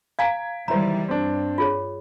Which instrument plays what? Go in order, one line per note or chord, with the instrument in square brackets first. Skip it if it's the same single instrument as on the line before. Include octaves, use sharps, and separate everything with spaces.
[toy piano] F5 G#5 A#5 [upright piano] G#6 B6 D7
[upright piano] F#1 E4 C5 [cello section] D#3 E3 G3 [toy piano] A#5
[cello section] G2 [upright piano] C4 D4
[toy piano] F4 G#4 C#5